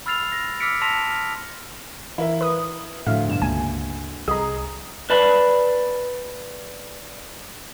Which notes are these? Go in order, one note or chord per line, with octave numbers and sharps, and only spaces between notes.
B5 E6 F6 A6 C7 F7
A#6
D6 E6 F6 B6 C#7 D7
A5 C6 E6 A#6 B6 F7
F6
E3 E4 A#4 E5
B4 D#6
D2 A2 F3 E5 F5
G2 B2 E7
C#2 A#3 G#5
C2 G#4 D#5 A#5 D#6
B4 D5 A5 B5